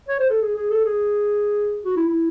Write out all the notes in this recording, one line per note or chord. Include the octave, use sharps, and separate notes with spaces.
C#5
C5
A4
G#4
G#4
A4
G#4
F#4
E4
E4